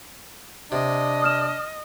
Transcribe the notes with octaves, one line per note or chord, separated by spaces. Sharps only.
C3 D4 D#5
D#6 F6 E7